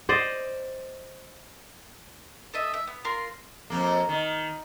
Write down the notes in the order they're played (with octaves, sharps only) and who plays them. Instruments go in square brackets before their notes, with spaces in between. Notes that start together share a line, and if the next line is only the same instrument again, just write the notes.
[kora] C5 D5 D#5
[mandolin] A4 D#5 E5
E5
B3
F4 A#4 C6
[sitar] F2 A#3
D#3